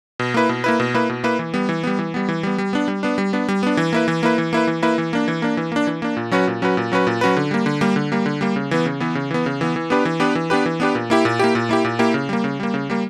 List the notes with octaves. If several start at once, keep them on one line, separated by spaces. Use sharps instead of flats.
B2
A#3 E4 B4
B2
A#3 E4 B4
B2
A#3 E4 B4
B2
A#3 E4 B4
E3
G3 B3
E3
G3 B3
E3
G3 B3
E3
G3 B3
G3
B3 D4
G3
B3 D4
G3
B3 D4
G3
B3 D4
E3
A#3 E4 B4
E3
A#3 E4 B4
E3
A#3 E4 B4
E3
A#3 E4 B4
E3
A#3 D4
E3
A#3 D4
E3
A#3 D4
E3
A#3 D4
A#2
F#3 C#4 F#4 B4
A#2
F#3 C#4 F#4 B4
A#2
F#3 C#4 F#4 B4
A#2
F#3 C#4 F#4 B4
D3
G3 A#3
D3
G3 A#3
D3
G3 A#3
D3
G3 A#3
C#3
E3 B3
C#3
E3 B3
C#3
E3 B3
C#3
E3 B3
E3
B3 D4 G4 B4
E3
B3 D4 G4 B4
E3
B3 D4 G4 B4
E3
B3 D4 G4 B4
A#2
A#3 E4 G4
A#2
A#3 E4 G4
A#2
A#3 E4 G4
A#2
A#3 E4 G4
C#3
G3 A#3
C#3
G3 A#3
C#3
G3 A#3